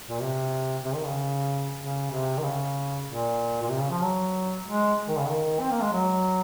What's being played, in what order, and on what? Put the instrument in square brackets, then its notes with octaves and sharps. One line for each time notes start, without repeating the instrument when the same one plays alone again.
[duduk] A#2
C3
C3
D#3
C#3
C#3
C3
D#3
C#3
A#2
A#2
C3
C#3
F3
F#3
G#3
D#3
C#3
D#3
C4
A#3
G#3
F#3